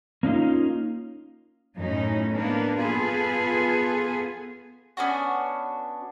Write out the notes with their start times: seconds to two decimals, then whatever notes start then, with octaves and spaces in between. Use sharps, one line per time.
0.23 A#3 C#4 D#4 F4
1.76 F#2 A2 C#4 D#4
2.33 A#3 B3 D4 A#4
2.79 B3 F4 G#4 A4
4.97 B3 C#4 D4 F#4